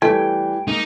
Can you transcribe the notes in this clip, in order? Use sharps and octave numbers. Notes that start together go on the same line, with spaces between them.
E3 G3 A3 G5 G#5
G#3 A#3 D#4